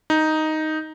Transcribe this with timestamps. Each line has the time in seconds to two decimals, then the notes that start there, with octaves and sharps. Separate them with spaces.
0.10 D#4